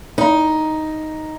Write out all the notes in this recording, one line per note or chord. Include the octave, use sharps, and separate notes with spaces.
D#4